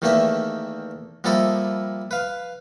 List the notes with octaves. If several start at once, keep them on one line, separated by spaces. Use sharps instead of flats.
E2 D#3 A3 A#3 G4 E5
F3 G3 A#3 E4 A4 D#5
B4 F5